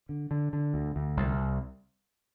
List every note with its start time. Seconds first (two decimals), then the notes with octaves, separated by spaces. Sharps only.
0.09 D3
0.31 D3
0.53 D3
0.74 D2
0.96 D2
1.17 C2